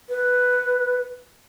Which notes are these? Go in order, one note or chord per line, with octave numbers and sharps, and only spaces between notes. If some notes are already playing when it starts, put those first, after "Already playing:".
B4